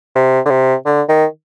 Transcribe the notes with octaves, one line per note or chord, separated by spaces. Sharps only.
C3
D3
C3
D3
D#3